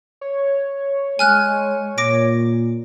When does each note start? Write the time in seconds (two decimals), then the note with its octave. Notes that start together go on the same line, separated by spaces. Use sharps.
0.21 C#5
1.19 G#3 G#5 F6 F#6
1.98 A#2 D6 A#6 D7